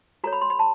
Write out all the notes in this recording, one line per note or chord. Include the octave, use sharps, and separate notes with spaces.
F#4 A4 C#5 A#5
B5
C6
B5
A5